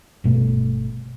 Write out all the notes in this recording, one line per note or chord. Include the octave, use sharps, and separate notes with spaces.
G1 B2 A3